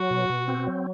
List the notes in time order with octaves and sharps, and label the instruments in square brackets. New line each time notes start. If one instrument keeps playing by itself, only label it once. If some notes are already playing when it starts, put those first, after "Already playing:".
Already playing: [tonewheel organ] F#3 [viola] F#4
[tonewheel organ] B2
B2
C4
F#3